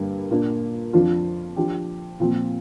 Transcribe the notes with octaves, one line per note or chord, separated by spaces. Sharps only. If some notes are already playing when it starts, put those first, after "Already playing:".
Already playing: G2 D3 G3 A#3
A#2 A#3 D4
F2 F3 D4 F4
F3 D4 G4
A#2 F3 C4